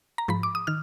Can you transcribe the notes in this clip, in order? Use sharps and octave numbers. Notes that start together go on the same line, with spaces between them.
A#5
G#2 F3 B5
D6
D#6
D#3 F6